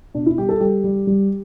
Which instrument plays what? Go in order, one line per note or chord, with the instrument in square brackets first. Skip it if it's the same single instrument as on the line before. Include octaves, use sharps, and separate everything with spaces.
[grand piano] B2 D4
E4
G3 G4
A4
G3 G4
G3
G3